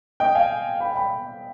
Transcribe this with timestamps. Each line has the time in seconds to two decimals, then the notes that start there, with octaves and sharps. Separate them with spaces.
0.20 D#5 G5
0.35 F5 G#5
0.80 G5 B5
0.96 G5 B5